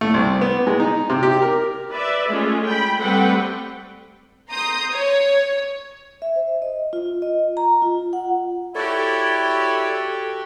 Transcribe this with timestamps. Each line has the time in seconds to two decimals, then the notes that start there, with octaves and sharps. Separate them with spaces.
0.01 A3
0.14 C2
0.41 B3
0.67 G#3
0.80 D#4
1.10 C3
1.23 G4
1.42 A#4
1.90 B4 D5 E5
2.29 G#3 A3 C#4 F4
2.65 G5 B5
2.98 G3 A3 C4 B4 F#5 G5
4.50 A#5 C6 D#6 G6
4.93 C#5
6.22 E5
6.36 C5
6.62 D#5
6.93 F4
7.22 D#5
7.57 A#5
7.82 F4
8.13 F#5
8.75 E4 F#4 G4 A4 C#5 D5